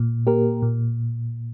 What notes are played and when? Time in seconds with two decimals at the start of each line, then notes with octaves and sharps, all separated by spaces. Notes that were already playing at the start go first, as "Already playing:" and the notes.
Already playing: A#2
0.27 A#3 G4 A#4
0.63 A#2